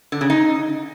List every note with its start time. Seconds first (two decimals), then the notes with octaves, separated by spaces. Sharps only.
0.12 D3
0.21 C#3
0.30 D#4